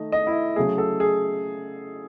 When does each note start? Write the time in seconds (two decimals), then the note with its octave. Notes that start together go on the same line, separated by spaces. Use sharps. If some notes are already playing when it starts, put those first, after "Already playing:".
Already playing: D#3 A3 D#5
0.12 D#5
0.27 E4
0.56 C#3 F#3 A3 G#4
0.78 A4
1.00 G#4